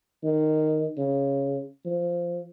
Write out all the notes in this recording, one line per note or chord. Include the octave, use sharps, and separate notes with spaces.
D#3
C#3
F3